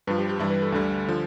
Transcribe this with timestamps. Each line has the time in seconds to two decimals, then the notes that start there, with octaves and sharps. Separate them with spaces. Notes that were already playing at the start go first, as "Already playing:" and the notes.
0.07 G2 F3 B4
0.18 G4
0.29 G4
0.39 G2 E3 G3 E4
0.50 B4
0.62 A4
0.72 D2 D3 G3
1.08 D3 F3